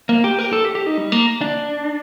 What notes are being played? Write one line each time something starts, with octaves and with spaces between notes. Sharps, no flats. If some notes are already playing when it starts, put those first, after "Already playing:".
A#3
G4
A#4
G4
A4
G4
G4
D#4
G3
A#3
D4